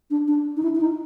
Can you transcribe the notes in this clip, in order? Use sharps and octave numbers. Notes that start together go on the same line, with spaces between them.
D4
D4
D#4
E4
E4
D#4